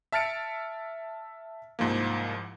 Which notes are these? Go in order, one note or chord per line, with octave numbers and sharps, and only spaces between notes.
E5 A5 F6 A6 C#7 D7
C2 G#2 F3 A#3